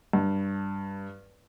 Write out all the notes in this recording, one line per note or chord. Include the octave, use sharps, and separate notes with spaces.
G2